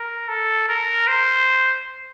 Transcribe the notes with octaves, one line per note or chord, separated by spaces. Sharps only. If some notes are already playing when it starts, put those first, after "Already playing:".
Already playing: A#4
A4
A#4
C5